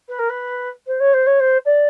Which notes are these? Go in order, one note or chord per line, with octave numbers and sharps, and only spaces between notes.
B4
A#4
B4
C5
C#5
C5
C#5
C5
D5